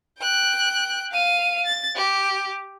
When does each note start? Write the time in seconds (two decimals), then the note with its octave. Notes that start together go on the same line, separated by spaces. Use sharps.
0.19 G5 F#6
1.13 F5 D#7
1.66 A6
1.96 G4